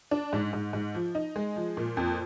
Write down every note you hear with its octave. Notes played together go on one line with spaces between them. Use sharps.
D4
G#2
G#2
G#2
F3
D#4
G#3
F3
A#2
F2